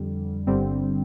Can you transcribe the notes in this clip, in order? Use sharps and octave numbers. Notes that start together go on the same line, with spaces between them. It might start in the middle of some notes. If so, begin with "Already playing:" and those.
Already playing: F2 D3 G3
G1 G2 D3 G3 C4